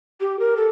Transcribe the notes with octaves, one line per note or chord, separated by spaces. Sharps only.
G4
A#4
A4